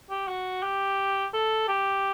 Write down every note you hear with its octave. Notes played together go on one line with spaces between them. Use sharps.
G4
F#4
G4
A4
G4